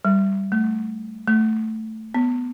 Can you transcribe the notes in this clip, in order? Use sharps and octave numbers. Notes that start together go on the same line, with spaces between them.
G3
A3
A3
B3